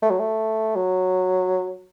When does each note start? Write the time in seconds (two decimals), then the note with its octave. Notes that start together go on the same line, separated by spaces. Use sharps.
0.02 A3
0.10 F#3
0.19 A3
0.76 F#3